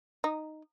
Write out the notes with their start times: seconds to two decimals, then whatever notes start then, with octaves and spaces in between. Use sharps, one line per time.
0.24 D#4